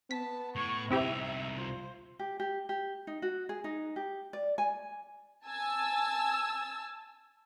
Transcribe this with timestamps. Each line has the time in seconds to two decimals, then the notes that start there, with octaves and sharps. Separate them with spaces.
0.11 B3 A5 B6
0.55 A2 C#6
0.91 C2 C4 D#4 E4 G4 E5
1.58 F4 C5
2.19 G4
2.40 G4
2.69 G4
3.07 D#4
3.22 F#4
3.49 G#4
3.64 D#4
3.96 G4
4.33 D5
4.58 G#5
5.46 G#5 A5 E6